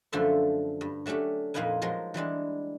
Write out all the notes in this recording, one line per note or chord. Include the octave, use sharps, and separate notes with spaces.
F#2 D3 F3 A3 E5 C6
G2
F#3 A3 C#4 D4 G4
F2 A#2 A#3 D#4 B4 G#5
F3 F#3 G#3 A#4
E3 G3 G#3 D4